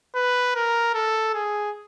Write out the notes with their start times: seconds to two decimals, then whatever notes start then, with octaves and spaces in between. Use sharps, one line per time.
0.15 B4
0.55 A#4
0.95 A4
1.34 G#4